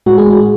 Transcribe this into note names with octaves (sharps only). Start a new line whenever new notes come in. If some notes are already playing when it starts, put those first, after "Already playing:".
A2 G#3 F#4
G#4
F#4